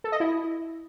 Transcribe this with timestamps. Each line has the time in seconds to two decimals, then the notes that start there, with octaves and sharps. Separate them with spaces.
0.04 A4
0.12 D#5
0.20 E4